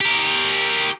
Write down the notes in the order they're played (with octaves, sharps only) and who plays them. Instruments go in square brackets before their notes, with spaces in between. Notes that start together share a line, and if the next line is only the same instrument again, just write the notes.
[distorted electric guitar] G4 A#4